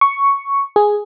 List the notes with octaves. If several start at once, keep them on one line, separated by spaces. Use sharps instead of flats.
C#6
G#4